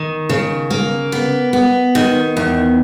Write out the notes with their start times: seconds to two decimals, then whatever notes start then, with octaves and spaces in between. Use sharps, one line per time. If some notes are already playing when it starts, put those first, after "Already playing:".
Already playing: D#3
0.29 C#3
0.70 A#3
1.12 B3
1.53 B3
1.95 D#3
2.37 E2